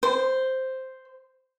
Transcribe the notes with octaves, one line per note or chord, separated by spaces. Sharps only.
C5